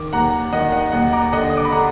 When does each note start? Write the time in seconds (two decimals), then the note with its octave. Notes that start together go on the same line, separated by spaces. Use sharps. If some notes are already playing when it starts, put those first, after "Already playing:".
Already playing: D#3 D6
0.13 D#2 F#5 A#5
0.53 D#3 D#5 F#5
0.72 D#5 F#5
0.92 D#2 D#5 F#5
1.13 A#5 D6
1.33 D3 D#5 F#5
1.50 D#6
1.57 D6
1.65 B5
1.72 D3 F#5 A#5